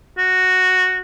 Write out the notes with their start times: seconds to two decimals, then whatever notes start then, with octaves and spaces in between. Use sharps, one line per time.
0.17 F#4